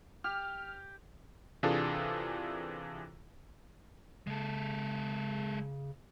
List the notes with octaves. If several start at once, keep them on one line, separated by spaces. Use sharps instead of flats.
G4 F6
C3 E3 D4 F4 G#4 A4
C#3 G#3 A4